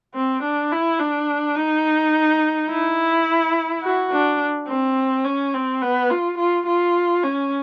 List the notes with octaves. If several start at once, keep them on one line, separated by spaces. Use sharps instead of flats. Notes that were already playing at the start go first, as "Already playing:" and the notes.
C4
D4
E4
D4
D#4
E4
F#4
D4
C4
C#4
C4
B3
F4
F4
F4
C#4